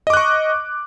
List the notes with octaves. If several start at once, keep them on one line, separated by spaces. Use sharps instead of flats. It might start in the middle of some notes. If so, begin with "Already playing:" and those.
D#5 C#6 D6 F#6